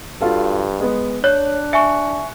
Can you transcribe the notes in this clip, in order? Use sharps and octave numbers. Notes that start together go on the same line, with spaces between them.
G2 F4 F#4 A4
G#3 B3
D4 C#5 F#6
E5 G#5 C#6 C#7